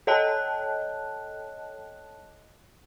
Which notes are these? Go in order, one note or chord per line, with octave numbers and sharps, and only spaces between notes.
A4 C#5 D#5 G5 A5 F#6